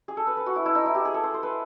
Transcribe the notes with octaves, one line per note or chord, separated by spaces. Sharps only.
G#4
A4
B4
B4
F#4
E4
E4
D#4
E4
G4
G#4
A4
C5
C5
B4